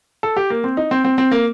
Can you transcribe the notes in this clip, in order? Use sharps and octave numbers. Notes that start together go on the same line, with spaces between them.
A4
G4
A#3
C4
D#4
C4
C4
C4
A#3